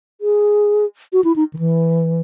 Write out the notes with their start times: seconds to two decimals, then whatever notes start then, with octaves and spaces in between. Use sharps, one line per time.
0.21 G#4
1.13 F#4
1.24 E4
1.36 D#4
1.54 D#3
1.59 E3